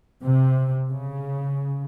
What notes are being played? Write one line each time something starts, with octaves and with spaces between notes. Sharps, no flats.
C3
C#3